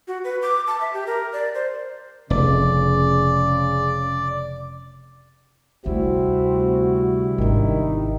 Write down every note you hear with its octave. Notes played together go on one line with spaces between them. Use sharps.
F#4
B4
D6
A5
E5
G4
A#4
D5
C5
F1 C#3 D5
D2 C3 G3 A3 C4 E4 F#4
G#1 D#3 D4